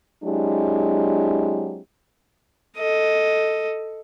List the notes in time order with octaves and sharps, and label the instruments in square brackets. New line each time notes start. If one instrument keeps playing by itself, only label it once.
[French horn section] F#3 G#3 C4 D4 E4 G4
[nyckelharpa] A4 D#5